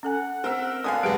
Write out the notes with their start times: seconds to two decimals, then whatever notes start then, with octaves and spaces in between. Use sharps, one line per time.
0.03 C#4 A4 F#5 G#5
0.44 C4 A#4 E5
0.84 D3 B3 F5 G#5 D#6
1.03 F1 G3 G4 G#4 B4 D7